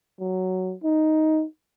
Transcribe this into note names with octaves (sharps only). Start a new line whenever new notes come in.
F#3
D#4